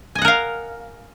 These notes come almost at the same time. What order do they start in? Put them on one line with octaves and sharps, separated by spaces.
G#5 D#5 F#5 A#4 F5